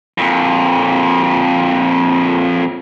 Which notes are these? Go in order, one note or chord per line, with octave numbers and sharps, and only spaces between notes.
F2 A#2